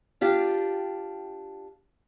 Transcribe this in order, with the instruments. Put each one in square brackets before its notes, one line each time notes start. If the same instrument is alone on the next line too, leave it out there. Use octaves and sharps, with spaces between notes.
[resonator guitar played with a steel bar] D4 F4 G4